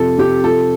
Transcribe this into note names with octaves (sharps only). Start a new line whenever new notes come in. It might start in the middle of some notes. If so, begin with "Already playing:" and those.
Already playing: F2 C3 F3 A4
C3 G4
F3 A4